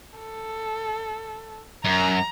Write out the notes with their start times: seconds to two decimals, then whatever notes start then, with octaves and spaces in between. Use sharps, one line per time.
0.19 A4
1.85 F#2 A#5